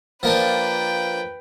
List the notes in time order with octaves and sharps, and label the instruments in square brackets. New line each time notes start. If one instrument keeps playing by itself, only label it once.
[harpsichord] F3 A#3 D4 [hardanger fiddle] B4 G5